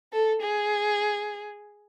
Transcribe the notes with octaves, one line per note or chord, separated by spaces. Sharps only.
A4
G#4